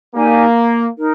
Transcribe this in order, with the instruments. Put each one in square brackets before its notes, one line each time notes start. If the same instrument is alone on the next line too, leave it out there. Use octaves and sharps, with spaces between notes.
[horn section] A#3 [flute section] D#4 G4 D5 G#5
[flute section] D#4 A#4